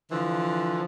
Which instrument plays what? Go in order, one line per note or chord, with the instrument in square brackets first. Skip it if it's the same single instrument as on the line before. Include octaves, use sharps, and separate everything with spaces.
[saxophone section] D3 E3 F3